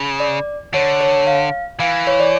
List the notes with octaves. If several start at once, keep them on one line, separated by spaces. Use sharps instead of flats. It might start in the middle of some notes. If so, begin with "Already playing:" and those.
Already playing: C#3
D5
D3 C#5
C#5
F5
E3 F5
C#5
D5